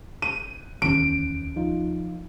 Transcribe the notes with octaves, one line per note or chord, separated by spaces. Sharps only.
D#7
D1 E2 D#3 C#4 D7
F3 D#4 F4